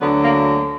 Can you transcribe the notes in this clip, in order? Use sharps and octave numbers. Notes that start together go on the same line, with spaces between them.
D2 D3 F#3 B3
A#3